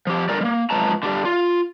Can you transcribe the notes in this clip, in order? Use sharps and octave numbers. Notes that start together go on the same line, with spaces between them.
F3 G4
D3 G3 A#4 D5
G3 A#3
F#2 F3 G#3 B4 A5 A#5
D3 D4 G4 D5
F4